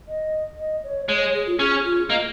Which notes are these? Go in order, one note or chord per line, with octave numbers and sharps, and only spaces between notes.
D#5
D#5
C#5
G#3 C#5
C#5
G#4
F4
C#4 G#4
F4
A#3 D#5